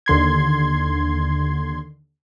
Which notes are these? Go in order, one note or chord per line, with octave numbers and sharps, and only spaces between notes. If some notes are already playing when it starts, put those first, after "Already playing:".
D#2 D3 C6 G#6